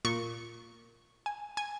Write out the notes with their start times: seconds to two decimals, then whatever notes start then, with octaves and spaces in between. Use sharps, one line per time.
0.05 A#2 C#6
1.26 G#5
1.57 G#5